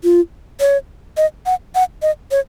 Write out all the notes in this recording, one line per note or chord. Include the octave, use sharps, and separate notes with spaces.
F4
C#5
D#5
F#5
F#5
D#5
C#5